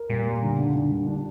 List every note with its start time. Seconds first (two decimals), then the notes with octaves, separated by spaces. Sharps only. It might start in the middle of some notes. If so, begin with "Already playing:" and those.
Already playing: A#4
0.10 A#2 G3
0.27 G3
0.42 D3
0.59 D3
0.75 D3
0.91 G3
1.07 D4